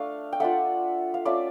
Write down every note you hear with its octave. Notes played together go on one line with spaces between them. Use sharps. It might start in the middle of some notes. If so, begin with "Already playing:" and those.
Already playing: A3 D4 F5
G5
A3 D4 F4 E5 F#5
F5
A3 C#4 F4 D5 E5